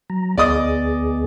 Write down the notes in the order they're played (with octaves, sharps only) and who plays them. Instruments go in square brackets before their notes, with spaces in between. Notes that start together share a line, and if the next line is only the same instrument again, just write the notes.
[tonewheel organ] F#3 A#5
[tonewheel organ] D2 B3 G#4 [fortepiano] D5 D#5 D#6